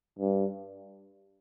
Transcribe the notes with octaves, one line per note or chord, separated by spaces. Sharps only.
G2